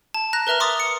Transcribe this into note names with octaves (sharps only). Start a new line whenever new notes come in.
A5
A#5 F#6 A#6
A#4 B4 E5 A#5 F6
C6 D6 D#6 A6
C#7